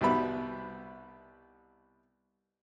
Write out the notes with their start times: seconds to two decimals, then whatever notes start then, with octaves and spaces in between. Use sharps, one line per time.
0.01 C2 B2 G3 B3 E5 B5